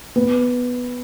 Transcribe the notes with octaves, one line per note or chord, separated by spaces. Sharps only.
B3